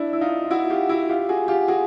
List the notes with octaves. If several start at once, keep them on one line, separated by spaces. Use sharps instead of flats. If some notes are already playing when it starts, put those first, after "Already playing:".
Already playing: D4 E4
E4
D#4 F4
F4
E4 F#4
F4 G4
E4 F#4
F4 G4
F#4 G#4
F4 G4
F#4 G#4